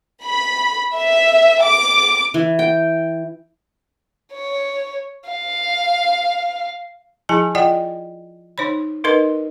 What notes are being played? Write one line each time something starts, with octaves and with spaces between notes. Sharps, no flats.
B5
E5
D6
E3
G5
C#5
F5
F3 E4 G#4 G#5 A5
F4 D5 D#5 F#5 G5
D#4 C5 C#5 B5
D#4 A#4 B4 D#5 C6